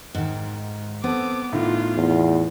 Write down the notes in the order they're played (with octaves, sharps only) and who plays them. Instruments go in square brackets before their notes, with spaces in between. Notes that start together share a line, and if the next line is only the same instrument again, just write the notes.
[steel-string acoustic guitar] G#2 D#3
[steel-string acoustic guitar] B3 [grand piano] C4 A4 [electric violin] D6
[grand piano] A2 D#3 [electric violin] F4
[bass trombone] E2